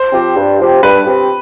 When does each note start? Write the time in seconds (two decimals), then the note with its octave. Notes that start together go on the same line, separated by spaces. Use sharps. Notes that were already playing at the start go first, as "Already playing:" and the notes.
Already playing: C5
0.13 F3 C4 G4
0.37 G2
0.59 F3 C4 G4
0.83 G2 B4
1.06 F3 C4 G4